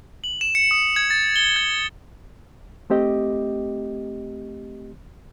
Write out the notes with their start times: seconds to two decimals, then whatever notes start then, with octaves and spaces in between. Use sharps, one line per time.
0.24 F#7
0.41 E7
0.55 C#7
0.71 D#6
0.96 G#6
1.10 A6
1.36 G7
1.56 G#6
2.90 A3 C4 G4 D#5